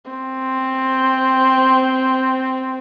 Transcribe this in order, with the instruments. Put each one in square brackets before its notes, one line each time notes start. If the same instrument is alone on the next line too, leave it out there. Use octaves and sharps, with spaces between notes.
[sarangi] C4